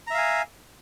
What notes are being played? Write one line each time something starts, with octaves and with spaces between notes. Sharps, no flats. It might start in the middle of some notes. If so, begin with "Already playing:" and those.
E5 F5 G#5 A#5